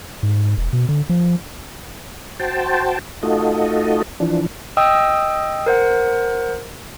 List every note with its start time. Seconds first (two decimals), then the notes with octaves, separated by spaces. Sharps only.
0.23 G#2
0.58 E1
0.73 B2
0.89 D3
1.09 F3
2.39 F#4 C5 G5 A5
3.23 A3 D#4 F4 F#4 A4 D#5
4.20 E3 F3 D4
4.77 D#5 G5 D#6 E6
5.66 A#4 C5 F#5